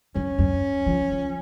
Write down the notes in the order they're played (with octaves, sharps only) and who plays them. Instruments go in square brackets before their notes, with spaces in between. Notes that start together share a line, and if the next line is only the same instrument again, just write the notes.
[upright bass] F#2 [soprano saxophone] C#4
[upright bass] F#2
F3
F3